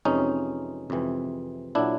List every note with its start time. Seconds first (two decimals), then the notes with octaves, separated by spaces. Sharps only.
0.05 F2 C3 E3 G#3 C#4 D#4
0.90 F2 C3 E3 G#3
1.75 A#2 F#3 D4 E4